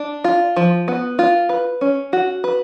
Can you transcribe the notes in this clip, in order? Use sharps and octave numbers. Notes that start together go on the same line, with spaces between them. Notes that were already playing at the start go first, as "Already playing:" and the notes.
Already playing: D4
F4
F3
B3
F4
B4
C#4
F#4
B4